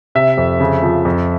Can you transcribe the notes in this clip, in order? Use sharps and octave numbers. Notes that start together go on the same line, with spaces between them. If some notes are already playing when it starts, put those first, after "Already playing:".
C3 E5
F2
C#3
F3
F2